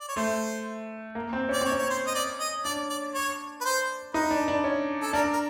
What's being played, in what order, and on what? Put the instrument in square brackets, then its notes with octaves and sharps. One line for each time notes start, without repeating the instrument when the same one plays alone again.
[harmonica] D5
C#5
[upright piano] A3 [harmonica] C5
[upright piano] A#3
C4
[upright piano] C#4 [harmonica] D5
[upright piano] C4 [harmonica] C#5
[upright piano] C#4
[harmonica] C#5
C5
D#5
D5
D#5
[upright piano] D4 [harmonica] D5
[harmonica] D5
C#5
B4
C5
[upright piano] D#4 [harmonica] B4
[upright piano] D4
D4
C#4
[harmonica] A4
[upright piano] D4 [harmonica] A#4
[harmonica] A#4